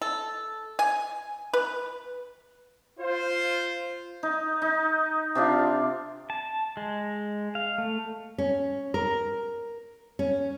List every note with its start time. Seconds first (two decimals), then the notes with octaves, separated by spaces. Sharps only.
0.02 A4
0.79 G#5
1.54 B4
3.00 F4 C5
4.23 D#4
4.62 D#4
5.35 C3 D4 F4
6.30 A5
6.77 G#3
7.55 F5
7.78 A3
8.38 C#4
8.94 A#4
10.19 C#4